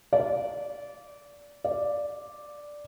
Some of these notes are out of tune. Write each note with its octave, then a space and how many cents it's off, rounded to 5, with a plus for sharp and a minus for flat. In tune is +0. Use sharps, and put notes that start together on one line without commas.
D5 -20
D5 +0